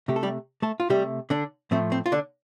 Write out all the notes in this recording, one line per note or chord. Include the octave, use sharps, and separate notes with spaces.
C3 A3 G4
A4
G3 G4
A3 A4
F4
C3 G3 A3 G4
D3 D4
A2 F3 A3 C4
C4
F4
D3 D4